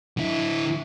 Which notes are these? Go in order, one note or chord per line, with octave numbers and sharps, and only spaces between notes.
D3 E4